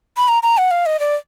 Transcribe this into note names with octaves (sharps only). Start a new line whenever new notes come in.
B5
A#5
A#5
F#5
F5
D#5
D5